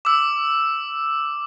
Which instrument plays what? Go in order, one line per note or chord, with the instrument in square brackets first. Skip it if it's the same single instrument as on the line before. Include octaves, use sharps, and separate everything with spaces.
[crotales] D6 E6